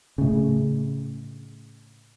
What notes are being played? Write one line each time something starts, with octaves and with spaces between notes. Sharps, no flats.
A2 C#3